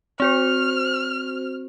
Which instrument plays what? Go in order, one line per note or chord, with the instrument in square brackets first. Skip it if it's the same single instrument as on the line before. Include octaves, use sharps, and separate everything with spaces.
[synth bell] C4 F#4 C5 [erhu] F6